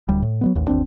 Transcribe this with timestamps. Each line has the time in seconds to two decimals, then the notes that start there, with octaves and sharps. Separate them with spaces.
0.09 D1 D2 G3
0.22 A2
0.41 F#3 G#3 B3
0.55 A1 D#2
0.68 G1 D#2 C4 D4